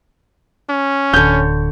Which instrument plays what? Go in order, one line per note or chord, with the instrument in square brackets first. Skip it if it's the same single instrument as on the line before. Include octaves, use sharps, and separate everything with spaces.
[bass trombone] C#4
[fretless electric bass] D1 [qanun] D3 C#5 [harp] G6